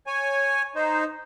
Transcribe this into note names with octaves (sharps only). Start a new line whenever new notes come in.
C#5 G#5
D#4 C5